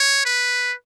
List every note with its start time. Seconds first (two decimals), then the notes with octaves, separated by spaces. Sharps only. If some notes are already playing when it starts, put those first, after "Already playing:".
Already playing: C#5
0.25 B4